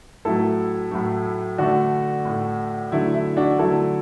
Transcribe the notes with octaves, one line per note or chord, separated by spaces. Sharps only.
A2 F#3 A3 E4 A4
A2 F#3 A3
D3 A3 D4 F#4
A2 A3
D3 F#3 A3 E4
E4
D4 F#4
D3 F#3 A3 E4 A4